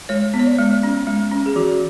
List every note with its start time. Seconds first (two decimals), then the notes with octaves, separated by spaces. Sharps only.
0.09 G#3 C#5
0.34 B3
0.39 C#5
0.47 D5
0.58 G#3
0.83 C#4
1.07 G#3
1.32 C#4
1.46 G#4
1.56 E3 F#4